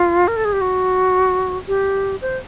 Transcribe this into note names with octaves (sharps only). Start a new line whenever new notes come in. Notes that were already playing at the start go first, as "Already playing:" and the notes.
Already playing: F4
A#4
A4
G#4
G4
F#4
G4
C5